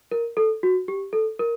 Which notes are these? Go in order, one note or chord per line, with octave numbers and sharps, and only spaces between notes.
A#4
A4
F#4
G4
A4
A#4